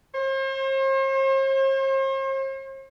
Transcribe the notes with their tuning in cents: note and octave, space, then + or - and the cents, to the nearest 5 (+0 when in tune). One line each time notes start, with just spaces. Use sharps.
C5 +45